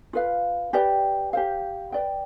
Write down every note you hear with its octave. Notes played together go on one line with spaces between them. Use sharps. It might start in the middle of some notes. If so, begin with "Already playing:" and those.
F4 B4 F5
G4 B4 D5 G5
G4 C5 F5
B4 D5 G5